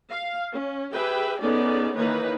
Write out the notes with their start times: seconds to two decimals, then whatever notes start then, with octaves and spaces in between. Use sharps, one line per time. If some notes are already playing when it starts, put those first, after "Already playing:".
0.10 F5
0.53 C#4
0.92 G4 G#4 B4 E5 G5
1.40 B3 C#4 D#4 G#4 A4 D5
1.95 D#3 E3 A#3 D#4 B4 C#5